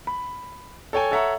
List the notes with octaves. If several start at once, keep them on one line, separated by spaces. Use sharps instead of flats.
B5
A4 C#5 G5 G#5
A4 C#5 E5 F#5 A#5 C#6